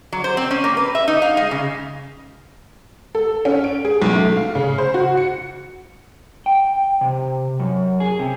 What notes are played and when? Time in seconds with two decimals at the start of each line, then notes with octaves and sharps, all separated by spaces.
0.12 F#3
0.24 C5
0.37 C4
0.51 C#4
0.64 A#3
0.77 B4
0.95 E5
1.08 D#4
1.22 F5
1.37 G#3
1.51 C#3
3.15 A4
3.45 C#4
3.64 D7
3.85 G#4
4.02 B1
4.15 A3
4.36 F5
4.55 C#3
4.78 C5
4.94 F#4
5.17 C#7
6.46 G5
7.01 C3
7.60 F#2
8.00 G#4
8.19 C3